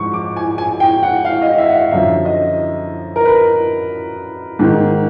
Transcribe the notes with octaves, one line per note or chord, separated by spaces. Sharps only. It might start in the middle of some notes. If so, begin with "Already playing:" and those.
Already playing: G#2 F3 C#6
D6
G#5
G#5
G5
F#5
F5
D#5
E5
F#5
F5
F#2 D3 F3 E5
D#5
A#4
B4
G#2 D#3